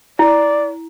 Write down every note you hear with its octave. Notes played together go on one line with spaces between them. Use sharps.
E4 D5